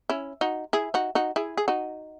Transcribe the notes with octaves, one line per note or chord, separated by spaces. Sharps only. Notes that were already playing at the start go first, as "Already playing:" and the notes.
C#4 E4
D#4 F#4
E4 G#4
D#4 F#4
D#4 F#4
E4 G#4
G#4
D#4 F#4